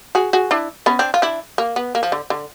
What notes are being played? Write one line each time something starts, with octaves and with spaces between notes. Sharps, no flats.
F#4 G#4
F#4 G#4
D4 E4
B3 C#4
C4 D4
F4
D4 E4
A#3
B3
A#3
F3
D3
D3